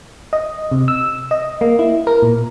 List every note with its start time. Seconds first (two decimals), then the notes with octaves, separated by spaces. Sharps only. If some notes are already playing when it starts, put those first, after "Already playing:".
0.33 D#5
0.72 C3
0.88 E6
1.31 D#5
1.61 A#3
1.79 E4
2.07 A#4
2.22 A#2